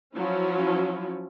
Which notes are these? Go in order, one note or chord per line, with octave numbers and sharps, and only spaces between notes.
F3 F#3 C#4 E4